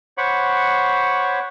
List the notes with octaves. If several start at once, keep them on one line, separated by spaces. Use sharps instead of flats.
C5 C#5 F#5 B5 C#6 D6